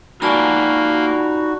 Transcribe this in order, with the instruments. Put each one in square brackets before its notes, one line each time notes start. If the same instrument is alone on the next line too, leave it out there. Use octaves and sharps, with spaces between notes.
[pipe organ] A#3 [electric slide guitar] D#4 F4 G#5 [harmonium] F#4 [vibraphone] D5 A5 B5